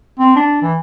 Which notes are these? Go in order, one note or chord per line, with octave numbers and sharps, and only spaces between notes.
C4
D4
E3